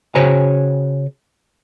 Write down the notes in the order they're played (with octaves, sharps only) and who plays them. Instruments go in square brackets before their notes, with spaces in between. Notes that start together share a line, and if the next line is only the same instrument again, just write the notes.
[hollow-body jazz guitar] C#3 F#4 C5 C#5 G#5 A#5